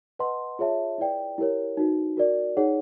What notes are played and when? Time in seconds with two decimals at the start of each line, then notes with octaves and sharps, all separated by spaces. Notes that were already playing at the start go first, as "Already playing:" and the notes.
0.19 B4 D#5 F#5 A5 C6
0.59 F4 G#4 C#5 E5 A5
0.98 E4 G#4 B4 D5 G5
1.38 E4 G4 A#4 C#5
1.77 D#4 F#4 B4
2.17 F#4 A#4 D5
2.57 D#4 G#4 C#5 F#5